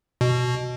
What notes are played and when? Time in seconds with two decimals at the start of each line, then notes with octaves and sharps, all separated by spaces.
0.21 B2